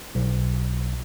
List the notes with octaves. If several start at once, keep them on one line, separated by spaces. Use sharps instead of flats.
B1